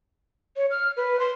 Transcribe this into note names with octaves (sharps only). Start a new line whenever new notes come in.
C#5
F6
B4
C6